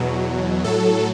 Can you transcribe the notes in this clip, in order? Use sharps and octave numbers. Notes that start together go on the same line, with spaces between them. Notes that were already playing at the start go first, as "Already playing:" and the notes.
Already playing: E2 B2 F#3
A2 F#3 A4